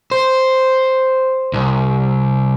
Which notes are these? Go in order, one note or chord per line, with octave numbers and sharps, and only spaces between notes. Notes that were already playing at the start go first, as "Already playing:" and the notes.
C5
C2